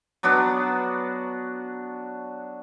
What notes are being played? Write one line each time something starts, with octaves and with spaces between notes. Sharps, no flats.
F#3 B3 D4 F#4